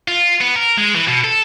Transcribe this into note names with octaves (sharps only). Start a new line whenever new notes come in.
F4
B3
A#4
G#3
E3
B2
A4